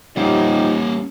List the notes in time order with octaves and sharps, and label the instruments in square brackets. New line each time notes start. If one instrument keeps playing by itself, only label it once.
[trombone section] F3 D#4 G4 [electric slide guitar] G3 C#4 [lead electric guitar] A#3 F#5